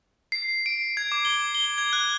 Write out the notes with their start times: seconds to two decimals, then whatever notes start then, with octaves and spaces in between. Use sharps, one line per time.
0.32 C7
0.66 D7
0.97 G#6
1.12 D6
1.25 G7
1.55 G7
1.78 G#6
1.93 F#6